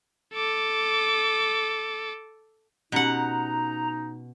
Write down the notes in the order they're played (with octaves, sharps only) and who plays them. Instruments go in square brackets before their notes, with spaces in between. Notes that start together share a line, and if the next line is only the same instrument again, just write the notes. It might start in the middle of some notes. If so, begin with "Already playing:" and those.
[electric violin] A4 D6
[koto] B2 F#5 [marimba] C#4 G4 [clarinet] D#4 [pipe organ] A#5